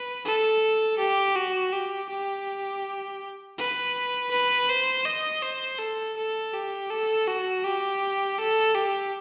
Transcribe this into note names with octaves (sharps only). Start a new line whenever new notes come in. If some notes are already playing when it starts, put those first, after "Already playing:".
Already playing: B4
A4
G4
F#4
G4
G4
B4
B4
C5
D#5
C5
A4
A4
G4
A4
F#4
G4
A4
G4